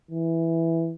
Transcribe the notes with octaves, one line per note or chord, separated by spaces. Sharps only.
E3